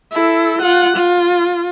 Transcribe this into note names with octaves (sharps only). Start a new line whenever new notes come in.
E4 A4
F4 F#5
F4